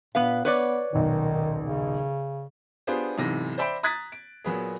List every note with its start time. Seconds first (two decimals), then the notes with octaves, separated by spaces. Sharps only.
0.15 A#2 B3 B4 F5
0.45 B3 B4 C#5 D5
0.93 D#1 B1 D#3
1.64 C#3
2.87 B3 D4 F4 G4 G#4 C5
3.18 B1 G#2 C3 E3 A#6
3.58 C5 D5 E5 G5 B5
3.83 A#5 D#6 F#6 G#6 A6 B6
4.12 D7
4.44 A#2 F#3 B3 G#4